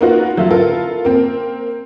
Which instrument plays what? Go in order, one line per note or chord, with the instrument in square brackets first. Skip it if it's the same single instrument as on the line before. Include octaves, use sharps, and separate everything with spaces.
[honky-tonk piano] A#3 B3 D#4 F4 F#4
F#3 A3 F4 E5
B3 E4 F4 A4 A#4
A#3 C4